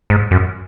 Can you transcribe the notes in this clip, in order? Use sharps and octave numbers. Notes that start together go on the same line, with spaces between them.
G#2
F#2